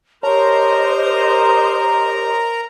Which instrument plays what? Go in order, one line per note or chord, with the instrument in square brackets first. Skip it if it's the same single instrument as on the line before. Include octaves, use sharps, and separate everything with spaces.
[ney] G4 [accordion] A#4 A#5 [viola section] C5 D#5 [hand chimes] C#5 A5